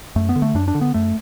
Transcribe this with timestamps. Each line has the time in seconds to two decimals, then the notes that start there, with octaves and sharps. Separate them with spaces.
0.16 F#2 A3
0.29 B3
0.36 D3
0.42 A3
0.55 F#2 D4
0.68 D4
0.75 D3
0.81 B3
0.94 F#2 A3